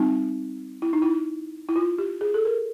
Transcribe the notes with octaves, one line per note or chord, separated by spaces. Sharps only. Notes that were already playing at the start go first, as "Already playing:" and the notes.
Already playing: G3 C4 D#4
E4
D#4
E4
E4
F4
G4
G#4
A4
A#4